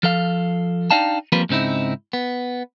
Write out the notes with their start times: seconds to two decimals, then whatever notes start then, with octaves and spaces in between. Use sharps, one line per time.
0.03 F3 A4 F5
0.91 D4 D#4 D5 F5 G5 A5
1.32 F3 G3 A#3 C4 F4 B4
1.49 G#2 C#3 C4 D#4 E4
2.13 B3